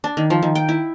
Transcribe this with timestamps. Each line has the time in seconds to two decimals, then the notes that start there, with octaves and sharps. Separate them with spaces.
0.04 D4
0.17 D#3
0.30 F3
0.42 D#3
0.55 G5
0.69 E4